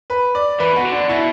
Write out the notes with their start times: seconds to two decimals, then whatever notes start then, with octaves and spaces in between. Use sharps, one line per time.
0.10 B4
0.35 D5
0.60 E3 B4
0.73 B2 F#4
0.85 D3
0.93 D4
1.09 B2 E4